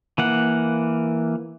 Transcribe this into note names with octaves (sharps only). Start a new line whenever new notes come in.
E3 A#3 F#5